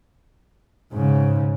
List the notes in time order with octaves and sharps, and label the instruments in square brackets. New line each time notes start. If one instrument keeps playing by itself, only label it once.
[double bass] G#2 C#3